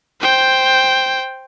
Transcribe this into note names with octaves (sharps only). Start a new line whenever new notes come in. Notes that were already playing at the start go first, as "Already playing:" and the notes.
C5 G5